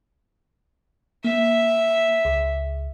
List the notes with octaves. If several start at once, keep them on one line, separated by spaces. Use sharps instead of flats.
A#3 E5
C#2